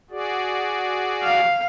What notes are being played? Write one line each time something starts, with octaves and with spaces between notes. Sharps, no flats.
F#4 G#4 D5
F5